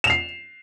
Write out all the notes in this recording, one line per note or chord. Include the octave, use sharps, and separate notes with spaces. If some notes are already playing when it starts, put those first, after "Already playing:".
C7 E7 F7